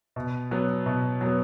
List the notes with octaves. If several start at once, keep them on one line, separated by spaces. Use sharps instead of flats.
B2
F#3 B3
B2
F#3 B3